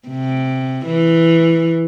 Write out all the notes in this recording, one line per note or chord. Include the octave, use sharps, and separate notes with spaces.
C3
E3